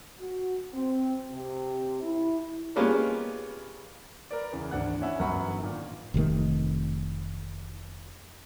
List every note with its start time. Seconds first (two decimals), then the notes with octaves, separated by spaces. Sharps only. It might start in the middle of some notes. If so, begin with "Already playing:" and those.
0.19 F#4
0.73 C4
1.30 C3
2.02 E4
2.76 G3 G#3 A#3 B3 C#4 F4
4.31 A#4 B4 D5
4.53 E2 C#3 E3
4.71 G#1 D2 D3 D4 F#5 F#6
5.01 C#4 E4 D#5 E5 F#5 G#5
5.19 G1 F#2 B3 F#5 B5 C#6
5.60 A#2 D#3
6.14 F1 C3 D#3 A3